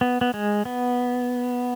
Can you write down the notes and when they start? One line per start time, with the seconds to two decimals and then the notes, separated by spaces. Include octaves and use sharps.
0.01 B3
0.21 B3
0.34 G#3
0.65 B3